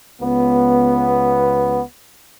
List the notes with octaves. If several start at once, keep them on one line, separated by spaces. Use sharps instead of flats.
C#2 B3